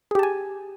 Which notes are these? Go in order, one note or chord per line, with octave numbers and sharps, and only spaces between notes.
G4 G#4 G#5 A5